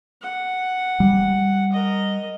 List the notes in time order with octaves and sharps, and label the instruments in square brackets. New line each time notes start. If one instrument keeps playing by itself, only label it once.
[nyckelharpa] F#5
[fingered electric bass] G3
[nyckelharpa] A#4 D#5